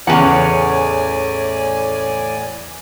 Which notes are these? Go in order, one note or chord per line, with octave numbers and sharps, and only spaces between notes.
E2 A2 C#3 D5 F#5 G#5